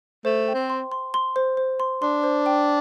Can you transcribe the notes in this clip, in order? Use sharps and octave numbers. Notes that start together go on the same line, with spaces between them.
A3 C5
G5
C4
C6
C6
C6
C5
C5
C6
D4 C6
C5
G5